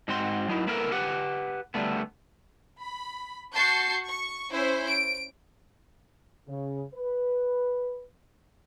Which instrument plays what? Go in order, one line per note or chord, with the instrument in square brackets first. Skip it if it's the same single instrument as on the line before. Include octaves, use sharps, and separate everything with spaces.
[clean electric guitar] G#2 C4 F#4 C6
F#3 D#4 E4
A#3 B3 E4 A4 A#4
G4 B4 F#5
D3 G3 A3 B3
[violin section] B5
F#4 A5 C#6 G6 C7
C#6
C#4 E4 C5
D7
[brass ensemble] C#3
B4